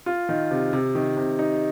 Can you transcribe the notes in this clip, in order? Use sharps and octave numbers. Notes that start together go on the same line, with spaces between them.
F4
D#3
C3
C3
D#3
C3
D#4